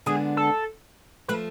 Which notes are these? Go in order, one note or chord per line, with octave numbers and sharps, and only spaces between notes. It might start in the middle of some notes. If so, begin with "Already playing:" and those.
D3 G#3 B3 D4 G#4
A4
F3 A3 F4 B4